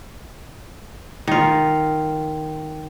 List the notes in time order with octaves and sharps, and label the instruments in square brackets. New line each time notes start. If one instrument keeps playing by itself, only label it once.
[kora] D#3 F4